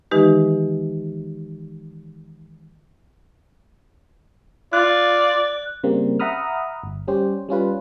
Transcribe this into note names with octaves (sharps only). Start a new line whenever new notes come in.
D#3 E3 G#3 D#4 G4 B4
F4 D5 F#6
C#3 G3 A#3 C4
E5 F#5 A#5 B5 D#6 F6
G1
G3 C#4 G4 C5
G3 C#4 F4 B4